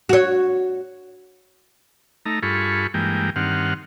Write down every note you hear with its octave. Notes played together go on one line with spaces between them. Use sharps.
F#4 C#5
A3 D#4 A#5
G2 F4 G#4 A4 B5 C#6
G2 E3 G#3 A#3 G5
G2 D#3 C4 F#5 F6